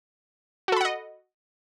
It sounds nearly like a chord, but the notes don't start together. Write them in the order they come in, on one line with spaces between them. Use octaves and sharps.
F#4 A4 B5 F#5 D#5